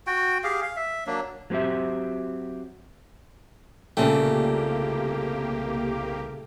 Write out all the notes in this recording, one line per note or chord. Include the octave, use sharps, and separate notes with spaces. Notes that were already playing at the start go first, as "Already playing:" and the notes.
F#4 G5
G4 G#4 F5
F5
E5
F#3 A#3 D4
F#3 A#3 C4 G4 E5
C2 A#2 C#3 A3 A#3 G4 G5